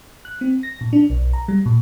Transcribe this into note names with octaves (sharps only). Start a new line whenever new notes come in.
F#6
C4
A#6
A#2
D4
B1
A#5
G3
A#2